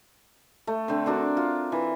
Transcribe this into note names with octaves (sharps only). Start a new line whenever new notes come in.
A3
D3 C4
C4 D4 F#4 A#4
F4
E3